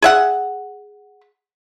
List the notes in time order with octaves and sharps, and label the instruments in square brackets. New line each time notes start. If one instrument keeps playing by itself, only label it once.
[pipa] G#4 E5 F#5